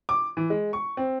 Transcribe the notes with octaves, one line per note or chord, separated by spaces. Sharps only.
D6
E3
G#3
C#6
C4